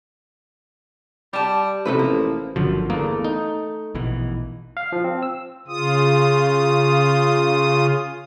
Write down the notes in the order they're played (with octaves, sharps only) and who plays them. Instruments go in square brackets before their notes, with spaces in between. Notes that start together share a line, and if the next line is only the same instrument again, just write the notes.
[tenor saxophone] G3 [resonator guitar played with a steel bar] G4 A5
[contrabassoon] A1 [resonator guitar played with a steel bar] C3 A3 B4 [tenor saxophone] F3
[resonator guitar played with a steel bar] A#3
[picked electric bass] G1 D3 F3 [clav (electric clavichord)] F#2
[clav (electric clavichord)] E2 A#3 [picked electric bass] A3
[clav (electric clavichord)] D#4
[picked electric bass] A#1 B2 E3
[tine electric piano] F5
F3
C4
E6
[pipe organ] C#3 F4 D#6